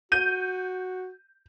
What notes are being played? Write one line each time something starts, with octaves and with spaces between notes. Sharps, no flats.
F#4 G6 D#7